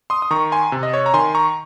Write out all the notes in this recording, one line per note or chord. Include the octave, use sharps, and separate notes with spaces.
C6 D#6
D#6
D#3 A#5 C#6
G#5 C6
C3
D#5
C#5
A#5
D#3 G#5 C6
A#5 C#6